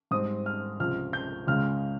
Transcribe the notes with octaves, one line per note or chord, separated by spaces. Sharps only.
G#2 G3 C4 D#6
F6
C#2 C3 F3 F6
G6
C#2 C#3 G#3 F6